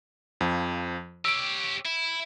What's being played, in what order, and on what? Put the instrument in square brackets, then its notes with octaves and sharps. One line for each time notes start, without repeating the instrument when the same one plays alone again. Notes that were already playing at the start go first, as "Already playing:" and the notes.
[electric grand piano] F2 F3
[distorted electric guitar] G4 C#5 [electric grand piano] E6 D7
[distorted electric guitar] E4